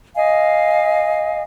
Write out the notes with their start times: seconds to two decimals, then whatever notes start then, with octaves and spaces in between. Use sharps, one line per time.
0.16 D#5 F5 G#5